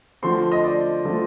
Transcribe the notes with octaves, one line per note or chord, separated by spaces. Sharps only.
D3 F3 A3 C4 C6
D#5
D5
D3 F3 A3 C4